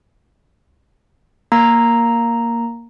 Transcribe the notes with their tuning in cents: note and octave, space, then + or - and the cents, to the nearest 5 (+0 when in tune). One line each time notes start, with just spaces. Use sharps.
A#3 +0 A#5 +0